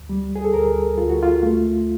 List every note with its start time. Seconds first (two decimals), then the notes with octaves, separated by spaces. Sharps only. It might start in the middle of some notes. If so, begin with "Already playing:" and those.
Already playing: D2
0.09 G3
0.36 G#4
0.44 A4
0.54 D2 A#4
0.98 D2 F4
1.10 F#4
1.23 F4
1.43 A3